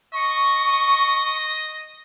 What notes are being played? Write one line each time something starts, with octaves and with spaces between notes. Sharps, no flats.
D#5 C#6